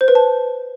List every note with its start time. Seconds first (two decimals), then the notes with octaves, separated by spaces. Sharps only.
0.01 C5
0.08 B4
0.15 A5